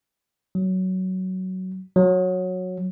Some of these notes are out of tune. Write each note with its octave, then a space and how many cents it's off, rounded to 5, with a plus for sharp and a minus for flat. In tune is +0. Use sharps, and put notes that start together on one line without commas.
F#3 +10
F#3 -15